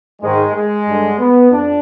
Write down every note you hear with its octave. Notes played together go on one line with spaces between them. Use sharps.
G#2 D#3 G#3
G#3
G2 D3
B3
F2 D4